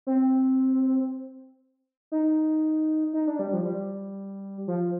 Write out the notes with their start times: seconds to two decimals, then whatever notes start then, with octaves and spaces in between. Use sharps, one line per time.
0.07 C4
2.12 D#4
3.14 D#4
3.27 D4
3.39 G3
3.53 F3
3.65 G3
4.67 F3